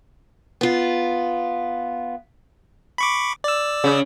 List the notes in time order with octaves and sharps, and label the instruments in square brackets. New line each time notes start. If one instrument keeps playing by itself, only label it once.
[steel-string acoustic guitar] B3 F4
[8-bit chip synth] B5 C#6 D6
D5 E6
[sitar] C#3